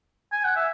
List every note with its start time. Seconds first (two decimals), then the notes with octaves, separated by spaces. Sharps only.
0.33 G#5
0.45 F#5
0.56 E5